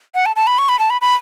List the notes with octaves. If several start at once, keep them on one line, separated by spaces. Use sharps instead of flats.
F#5
A5
A5
B5
C#6
B5
A5
B5
B5